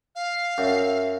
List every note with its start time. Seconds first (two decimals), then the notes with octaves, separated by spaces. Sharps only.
0.15 F5
0.58 F#2 E5